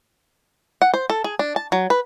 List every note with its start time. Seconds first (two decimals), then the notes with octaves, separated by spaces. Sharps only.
0.82 F#5
0.94 C5
1.10 A4
1.24 G#4
1.39 D4
1.56 A5
1.72 F#3
1.90 B4